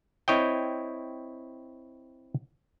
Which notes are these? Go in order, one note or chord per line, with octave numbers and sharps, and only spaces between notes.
C4 E4 C#5 D#5 G5